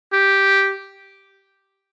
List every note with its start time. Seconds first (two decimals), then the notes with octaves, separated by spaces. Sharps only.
0.13 G4